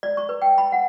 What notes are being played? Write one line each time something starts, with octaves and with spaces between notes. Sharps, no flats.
D5
C#6
B4
G5
B5
F#5